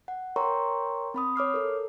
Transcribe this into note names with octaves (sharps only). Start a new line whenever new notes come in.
F#5
A#4 C#5 G5 A#5 C6 C#6
C4 B5 D#6
C#5 D6 F6 C7
A4 A#4